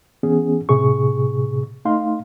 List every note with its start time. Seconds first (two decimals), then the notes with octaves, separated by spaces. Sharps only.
0.23 E3 B3 C#4 G#4
0.69 A2 C3 G#4 C#6
1.85 A3 D#4 F5 C6